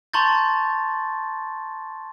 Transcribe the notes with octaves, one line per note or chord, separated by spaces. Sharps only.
A5 A#5 C6 C#6 G6 A6